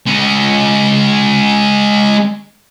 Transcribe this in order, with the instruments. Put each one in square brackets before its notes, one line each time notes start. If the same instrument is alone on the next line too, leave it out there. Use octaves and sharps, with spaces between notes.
[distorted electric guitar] G#3 C#4